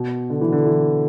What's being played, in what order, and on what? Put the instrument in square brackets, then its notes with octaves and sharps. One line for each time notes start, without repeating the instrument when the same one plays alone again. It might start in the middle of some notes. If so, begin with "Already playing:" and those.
Already playing: [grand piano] B2
D3
E3
D3
E3